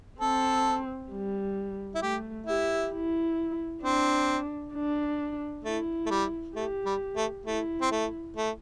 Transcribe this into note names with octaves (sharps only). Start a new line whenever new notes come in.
C4 A4
G3
E4
A3 G4
E4 G4
E4
C4 D4
D4
A3 E4
A3
G3
A3 G4
G3
A3
A3 E4
C4
A3
A3